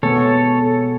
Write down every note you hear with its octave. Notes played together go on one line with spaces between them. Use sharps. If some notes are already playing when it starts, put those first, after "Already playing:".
B2 G#3 B3 A4 C#5